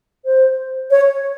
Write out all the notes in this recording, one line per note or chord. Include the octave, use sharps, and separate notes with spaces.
C5
C#5